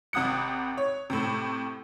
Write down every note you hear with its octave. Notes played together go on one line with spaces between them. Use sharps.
G#1 C3 F#5 D#6 F#6 C#7
C#5
A2 C3